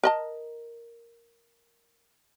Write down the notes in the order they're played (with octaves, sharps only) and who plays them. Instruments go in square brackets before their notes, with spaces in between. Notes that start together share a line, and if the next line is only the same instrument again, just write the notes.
[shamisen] A#4 D#5 A5